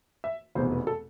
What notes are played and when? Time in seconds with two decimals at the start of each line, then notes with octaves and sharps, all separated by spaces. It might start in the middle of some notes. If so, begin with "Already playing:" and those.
0.24 E5
0.55 F1 E2 B2 C5
0.72 B4
0.87 A4